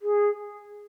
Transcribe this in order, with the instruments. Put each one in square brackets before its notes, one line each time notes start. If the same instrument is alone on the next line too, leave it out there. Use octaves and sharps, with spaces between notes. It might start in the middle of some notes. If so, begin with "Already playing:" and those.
[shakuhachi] G#4